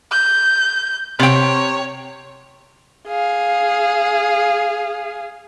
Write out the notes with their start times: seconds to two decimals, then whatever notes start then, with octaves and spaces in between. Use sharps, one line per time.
0.12 G6
1.19 C3 C#5 G5
3.08 G#4 F5